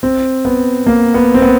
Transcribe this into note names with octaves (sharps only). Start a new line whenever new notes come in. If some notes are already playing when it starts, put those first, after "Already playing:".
C4
B3
A#3
B3
C4
B3